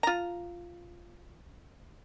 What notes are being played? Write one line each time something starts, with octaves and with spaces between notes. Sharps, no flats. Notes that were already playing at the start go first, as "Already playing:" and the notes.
F4 A#5